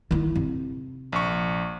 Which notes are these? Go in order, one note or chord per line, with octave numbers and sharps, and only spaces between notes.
D#3 E4
C3
A#1 C#6